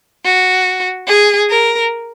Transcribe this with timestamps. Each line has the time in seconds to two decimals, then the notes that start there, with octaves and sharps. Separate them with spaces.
0.24 F#4
1.08 G#4
1.50 A#4